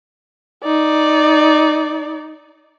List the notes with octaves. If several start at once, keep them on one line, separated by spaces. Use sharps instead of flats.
D#4 D5